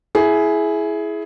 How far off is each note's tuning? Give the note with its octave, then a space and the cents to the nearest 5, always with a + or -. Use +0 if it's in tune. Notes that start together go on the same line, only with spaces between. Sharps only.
E4 +0 G#4 +15